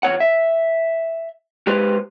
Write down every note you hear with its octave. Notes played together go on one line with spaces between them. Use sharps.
E2 G#2 C#5 F#5
E5
G#3 G4 B4 C5